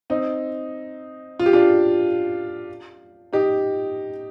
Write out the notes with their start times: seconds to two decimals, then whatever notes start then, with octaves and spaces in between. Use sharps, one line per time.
0.10 C4 D#4
1.39 F4
1.46 G4
1.53 D4 F4
3.33 D#4 G4